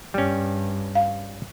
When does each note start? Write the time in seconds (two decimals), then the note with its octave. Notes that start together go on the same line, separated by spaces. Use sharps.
0.14 G2 G3 C#4
0.95 F5